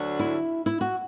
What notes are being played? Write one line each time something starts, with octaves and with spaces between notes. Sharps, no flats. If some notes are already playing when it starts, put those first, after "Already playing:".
Already playing: D2 D3 F#3 D4 F#4
E4
E4
F#4